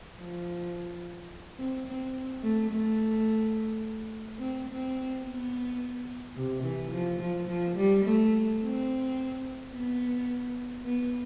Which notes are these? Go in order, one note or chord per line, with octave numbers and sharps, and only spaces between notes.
F3
C4
C4
A3
A3
C4
C4
B3
C3
E3
F3
F3
F3
G3
A3
C4
B3
B3